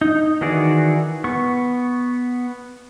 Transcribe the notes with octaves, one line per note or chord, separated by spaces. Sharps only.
D#4
D#3 E3 F#4 G#4 D5
B3 C#6